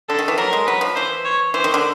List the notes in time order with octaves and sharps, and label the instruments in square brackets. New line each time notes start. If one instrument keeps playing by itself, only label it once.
[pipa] D3 [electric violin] A4
[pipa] D#3
E3
[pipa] F#3 [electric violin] A#4
[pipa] G#3
[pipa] F#3 [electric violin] B4
[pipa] F3
[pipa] E3 [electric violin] C5
[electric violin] C#5
[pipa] E3 [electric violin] C5
[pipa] D#3
D3